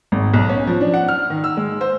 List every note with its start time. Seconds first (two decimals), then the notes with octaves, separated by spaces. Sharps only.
0.12 G#1
0.33 B1
0.49 C#4
0.67 F3
0.81 D4
0.94 F#5
1.08 F6
1.30 D#3
1.44 E6
1.57 G#3
1.81 C5